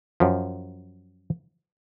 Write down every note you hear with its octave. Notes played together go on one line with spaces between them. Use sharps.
F#2 F3